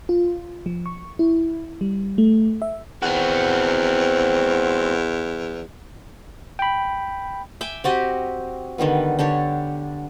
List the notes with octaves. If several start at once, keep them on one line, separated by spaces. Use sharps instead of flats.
F4
F3
C#6
E4
G3
A3
E5
E2 C4 F#4
G5 B5
E5 G5 G#5 D6
C4 F#4 G4 D#5
D3 D#3 G3 B3
D3 D4 G4 C#5